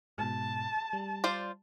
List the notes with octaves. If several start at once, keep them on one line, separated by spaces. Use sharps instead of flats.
G#2 B2 A5
G3
F4 C5 D5